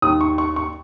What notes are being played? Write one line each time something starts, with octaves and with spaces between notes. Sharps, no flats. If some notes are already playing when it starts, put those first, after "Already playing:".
D#2 D#3 D#6
C#6
C#6
C#6